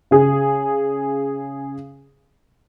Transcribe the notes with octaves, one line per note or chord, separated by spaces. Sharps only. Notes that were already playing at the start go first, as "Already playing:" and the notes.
C#3 G#4